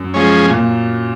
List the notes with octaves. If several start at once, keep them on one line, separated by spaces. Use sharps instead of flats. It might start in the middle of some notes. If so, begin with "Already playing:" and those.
Already playing: F#2
F3 G#3 C#4
A#2